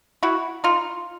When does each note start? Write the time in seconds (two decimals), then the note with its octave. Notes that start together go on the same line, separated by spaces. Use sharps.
0.23 E4 F#4
0.64 D#4 F4